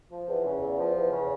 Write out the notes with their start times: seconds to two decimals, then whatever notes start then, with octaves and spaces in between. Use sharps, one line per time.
0.11 F3
0.28 E2
0.45 C#3
0.60 E2
0.78 F3
0.95 E2
1.11 C#3